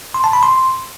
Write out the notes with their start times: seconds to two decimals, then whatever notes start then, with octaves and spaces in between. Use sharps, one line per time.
0.14 C6
0.24 A5
0.33 B5
0.43 C6